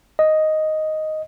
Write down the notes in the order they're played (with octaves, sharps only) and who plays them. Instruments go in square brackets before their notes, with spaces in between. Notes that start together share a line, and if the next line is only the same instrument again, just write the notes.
[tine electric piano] D#5